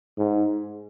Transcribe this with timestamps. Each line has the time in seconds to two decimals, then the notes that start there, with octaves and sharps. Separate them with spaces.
0.18 G#2